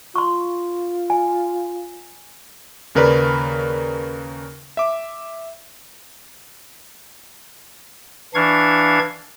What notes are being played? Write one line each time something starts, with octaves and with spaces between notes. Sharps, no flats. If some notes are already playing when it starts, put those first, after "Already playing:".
F4 C6 C#6
G#5
D#2 C#3 A#4 B4 D5 B5
E5 D6
E3 D4 F5 C#6 G#6